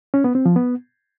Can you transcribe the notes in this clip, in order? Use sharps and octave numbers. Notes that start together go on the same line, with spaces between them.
C#4
B3
C4
F3
B3